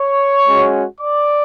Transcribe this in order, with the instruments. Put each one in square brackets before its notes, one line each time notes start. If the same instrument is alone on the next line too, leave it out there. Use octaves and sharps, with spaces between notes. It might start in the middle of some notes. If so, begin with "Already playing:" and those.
Already playing: [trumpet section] C#5 C#6
G#3 C#4 F#4
D5 D6